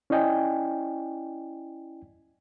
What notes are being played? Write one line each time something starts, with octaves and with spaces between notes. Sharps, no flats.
C#4 E4 D5 D#5 G5 G#5